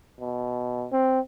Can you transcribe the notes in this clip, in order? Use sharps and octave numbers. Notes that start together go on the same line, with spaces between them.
B2
C4